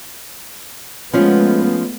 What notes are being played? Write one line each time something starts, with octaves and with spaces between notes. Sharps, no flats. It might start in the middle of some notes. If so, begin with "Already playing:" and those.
F3 G#3 A3 B3 C#4 F4